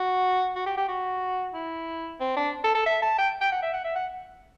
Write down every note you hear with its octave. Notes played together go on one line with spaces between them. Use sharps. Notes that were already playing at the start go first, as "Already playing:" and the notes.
Already playing: F#4
F#4
G4
G4
F#4
E4
C4
D4
A4
A4
E5
A5
G5
G5
F#5
E5
F#5
E5
F#5